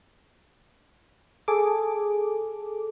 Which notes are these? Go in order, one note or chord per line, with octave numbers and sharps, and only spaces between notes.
G#4 A4 D6